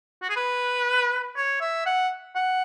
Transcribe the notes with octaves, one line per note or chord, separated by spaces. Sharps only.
F#4
G#4
B4
C#5
E5
F#5
F#5